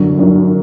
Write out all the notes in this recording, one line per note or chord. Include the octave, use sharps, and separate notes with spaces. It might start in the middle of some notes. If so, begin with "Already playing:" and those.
Already playing: F#2 D3 F#3
F#2 D3 F#3